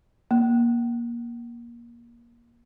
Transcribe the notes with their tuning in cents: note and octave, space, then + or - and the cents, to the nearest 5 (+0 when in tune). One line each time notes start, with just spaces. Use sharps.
A#3 +20